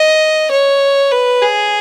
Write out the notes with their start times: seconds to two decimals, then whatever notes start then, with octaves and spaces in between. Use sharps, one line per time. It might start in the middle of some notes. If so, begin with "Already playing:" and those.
Already playing: D#5
0.51 C#5
1.11 B4
1.42 G#4